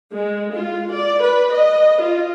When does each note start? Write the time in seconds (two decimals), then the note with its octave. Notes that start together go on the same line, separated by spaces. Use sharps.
0.11 G#3
0.55 F4
0.92 D5
1.22 B4
1.52 D#5
2.01 F4